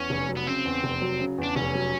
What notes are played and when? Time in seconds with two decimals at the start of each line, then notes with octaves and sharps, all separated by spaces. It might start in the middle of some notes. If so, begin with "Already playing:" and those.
Already playing: E2 C#4
0.10 F1
0.28 F#3
0.37 B3
0.46 C#3 C4
0.65 E2
0.84 F1
1.01 F#3
1.20 C#3
1.38 E2
1.43 D4
1.56 F1 C#4
1.75 F#3